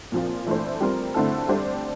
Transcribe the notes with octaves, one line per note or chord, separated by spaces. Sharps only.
A#2 F3 C4 F4
E3 A3 D4 A4 C5
G3 C4 F4 A#4
D3 A3 C4 E4 A4
G3 D4 A4 C5